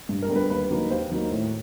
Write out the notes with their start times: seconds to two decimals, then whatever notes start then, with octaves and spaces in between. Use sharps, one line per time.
0.09 G2
0.22 A#4
0.29 D3 G3 B3
0.36 B4
0.49 D#2 B4
0.71 D#3 F#3 A#3
0.90 D#2 C5
1.11 D#3 F#3 A#3
1.31 A2